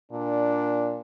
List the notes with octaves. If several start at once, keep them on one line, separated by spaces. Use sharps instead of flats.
A#2 D4